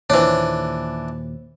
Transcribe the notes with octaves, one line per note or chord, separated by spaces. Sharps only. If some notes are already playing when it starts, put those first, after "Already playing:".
D#2 A#2 E3 D4 C5 C#5